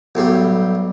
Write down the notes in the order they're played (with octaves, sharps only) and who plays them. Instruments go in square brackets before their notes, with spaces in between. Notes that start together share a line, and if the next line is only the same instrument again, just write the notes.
[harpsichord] B1 A2 G3